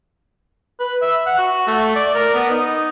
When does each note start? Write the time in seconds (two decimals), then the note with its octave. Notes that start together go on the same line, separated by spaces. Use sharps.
0.80 B4
1.02 E5
1.26 F#5
1.38 F#4
1.67 A3
1.96 D5
2.15 A#4
2.34 B3
2.51 D#4